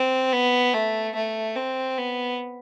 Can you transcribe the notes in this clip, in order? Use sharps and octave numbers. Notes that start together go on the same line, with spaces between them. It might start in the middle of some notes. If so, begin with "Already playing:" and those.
Already playing: C4
B3
A3
A3
C4
B3